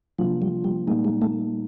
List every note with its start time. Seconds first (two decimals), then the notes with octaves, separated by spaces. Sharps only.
0.19 C3 F3 F#3 A#3 D4 F4
0.42 G3
0.64 G3
0.87 A#2 G3 G#3 A#3 D#4
1.04 G#3
1.22 A3